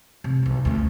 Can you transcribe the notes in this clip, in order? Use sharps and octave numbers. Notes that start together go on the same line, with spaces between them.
C3
B1 E4
D2 C#4